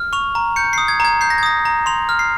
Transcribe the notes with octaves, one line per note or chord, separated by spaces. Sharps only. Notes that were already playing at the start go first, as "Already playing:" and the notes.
Already playing: F6
C#6 F7
A#5
G6 C#7
D#6 C7
G#6
A#5 G#6
G6 C7
A#6
G#6
D#6 A#6
A#5
C6 F7
F6
C7